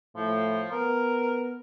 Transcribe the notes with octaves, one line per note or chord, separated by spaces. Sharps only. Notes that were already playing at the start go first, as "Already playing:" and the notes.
A2 F3
B3 A#4